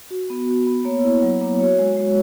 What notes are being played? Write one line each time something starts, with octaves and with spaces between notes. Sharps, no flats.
F#4
B3
F#4
B3
A#3 C#5
E4
F#3
A#3
F#4 C#5
G#3
F#4
G#3 F#4